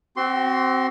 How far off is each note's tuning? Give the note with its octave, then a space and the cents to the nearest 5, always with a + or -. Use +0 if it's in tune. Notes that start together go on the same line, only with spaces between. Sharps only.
C4 +0 F#4 +35 C6 +0